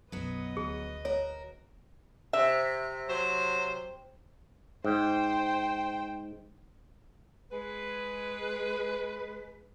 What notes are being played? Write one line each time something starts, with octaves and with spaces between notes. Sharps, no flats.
B1 F#2 F#3 B3 B4 D#5
D2 G#4
F#4 A#4 C#5
C3 E5
F#3 C5
G#2 C5 G5
G#3 G#4 B4